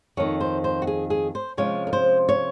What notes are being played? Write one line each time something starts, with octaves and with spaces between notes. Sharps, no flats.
F2 D#3 A#3 C#5
C5
C5
F#4
G#4
G#4
C5
C3 F3 G#3 C#4 C#5
A#4
C5
C#5